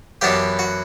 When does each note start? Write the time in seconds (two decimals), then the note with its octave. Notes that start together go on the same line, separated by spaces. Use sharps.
0.21 F#2 E3 B3 D4 G4
0.59 F#4